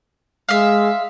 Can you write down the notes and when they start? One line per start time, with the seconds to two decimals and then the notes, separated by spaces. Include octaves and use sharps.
0.49 G#3 E5 F5